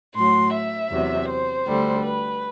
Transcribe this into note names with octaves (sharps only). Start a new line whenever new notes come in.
A2 F#3 C6
E5
E2 C3 F#3
C5
D2 D3 G3
B4